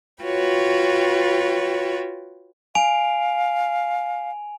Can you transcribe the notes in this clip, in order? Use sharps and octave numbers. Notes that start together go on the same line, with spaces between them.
F4 F#4 B4 C#5 G5
F5 G#5 D7 F7